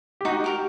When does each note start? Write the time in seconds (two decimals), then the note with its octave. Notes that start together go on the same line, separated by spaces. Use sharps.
0.21 G4
0.25 D#4 F#4
0.44 G4 A#4